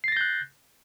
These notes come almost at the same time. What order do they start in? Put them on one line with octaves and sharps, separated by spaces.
C7 A6 A#6 G6 F#6